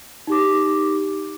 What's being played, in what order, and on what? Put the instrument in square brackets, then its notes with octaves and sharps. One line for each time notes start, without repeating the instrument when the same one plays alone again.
[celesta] D#4 G4 D6